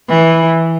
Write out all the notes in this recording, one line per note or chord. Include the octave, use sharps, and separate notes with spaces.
E3